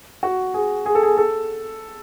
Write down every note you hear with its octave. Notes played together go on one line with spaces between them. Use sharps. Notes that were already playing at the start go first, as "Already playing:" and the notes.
F#4
G#4
G#4
A4
G#4
A4